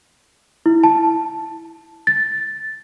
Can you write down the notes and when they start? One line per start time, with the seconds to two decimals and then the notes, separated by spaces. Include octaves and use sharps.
0.66 E4
0.83 A5
2.07 A6